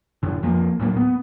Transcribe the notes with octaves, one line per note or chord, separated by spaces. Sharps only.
F#2 D3
F2 F3 A#3
D2 A2 F#3 A#3
B3